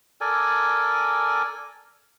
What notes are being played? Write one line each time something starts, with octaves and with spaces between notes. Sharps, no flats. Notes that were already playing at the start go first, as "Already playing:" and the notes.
A4 A#4 D5 G#5